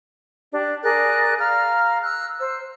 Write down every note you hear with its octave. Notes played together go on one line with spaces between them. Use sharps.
D4 G4
G#4 A#4 D5 F#6
F5 A#5 F6
E6 F#6
C5 E6